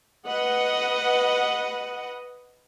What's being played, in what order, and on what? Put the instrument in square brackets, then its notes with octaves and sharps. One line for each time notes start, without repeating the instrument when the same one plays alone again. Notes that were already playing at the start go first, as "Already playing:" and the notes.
[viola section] B4 D#5 F#5